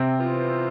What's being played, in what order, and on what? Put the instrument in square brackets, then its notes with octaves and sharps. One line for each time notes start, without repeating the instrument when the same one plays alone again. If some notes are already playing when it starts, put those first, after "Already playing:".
Already playing: [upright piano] C3 C4
[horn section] E3 B3 F4 C5